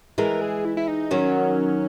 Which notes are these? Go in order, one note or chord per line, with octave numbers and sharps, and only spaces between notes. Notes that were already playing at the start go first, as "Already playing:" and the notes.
E3 G#3 A#4
G#4
E4
E4
D#4
D#3 F#3 C#4